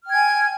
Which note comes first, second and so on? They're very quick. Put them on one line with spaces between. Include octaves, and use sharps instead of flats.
F6 G5 G#6 G#5